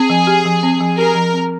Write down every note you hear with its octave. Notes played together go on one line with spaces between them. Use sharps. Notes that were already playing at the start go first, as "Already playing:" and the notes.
Already playing: C4 G#4
F3
G4
F3
C4
F3
G4 A#4
F3
C4